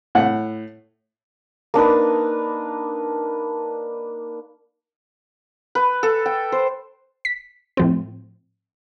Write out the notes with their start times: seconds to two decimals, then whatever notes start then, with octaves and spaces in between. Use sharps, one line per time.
0.15 A2 F#5
1.74 A#3 D4 D#4 B4
5.75 B4
6.03 A4
6.26 G5
6.52 C5
7.25 B6
7.77 A2 F3 C4